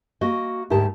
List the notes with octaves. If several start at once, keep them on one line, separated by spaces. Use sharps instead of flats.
A#3 F#4 D#5
D2 G#2 G4 A#4 A5